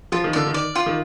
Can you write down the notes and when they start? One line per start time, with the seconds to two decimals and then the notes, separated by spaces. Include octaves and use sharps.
0.12 F3 F4
0.24 D#3
0.33 D3 D5
0.47 D#3
0.54 D5
0.75 F4
0.86 D#3